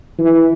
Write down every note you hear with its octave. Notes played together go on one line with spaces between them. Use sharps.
E3